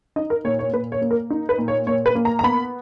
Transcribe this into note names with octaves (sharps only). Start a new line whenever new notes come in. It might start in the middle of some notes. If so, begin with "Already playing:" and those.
D#4 D#5
A#4
A#2 C#5
C#5
A#2 B4
C#5
A#3
A#4
D#4
B4
A#2
C#5
A#2 C#5
B4
A#3
A#5
A#5
B3 B5